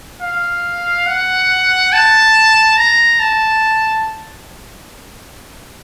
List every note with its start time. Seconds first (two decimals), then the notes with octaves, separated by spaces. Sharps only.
0.21 F5
1.07 F#5
1.93 A5
2.78 A#5
3.20 A5